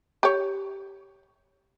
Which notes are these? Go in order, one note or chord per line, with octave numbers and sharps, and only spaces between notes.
G4 C#5